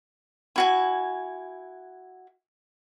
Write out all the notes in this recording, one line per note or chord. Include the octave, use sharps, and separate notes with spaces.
E4 F#4 G#5